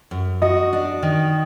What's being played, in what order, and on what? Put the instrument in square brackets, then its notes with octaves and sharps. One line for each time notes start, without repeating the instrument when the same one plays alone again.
[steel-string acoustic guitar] F#2
[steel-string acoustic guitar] F#4 [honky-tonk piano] D#5
[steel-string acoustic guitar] D4
D#3